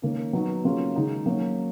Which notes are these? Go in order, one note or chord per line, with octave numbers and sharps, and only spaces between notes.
D#3 A#3 C#4
F#3 B3 D#4 F#4
C#3 F#3 A#3 C#4 F4
D#3 G#3 D#4 F#4
F#3 A#3 C#4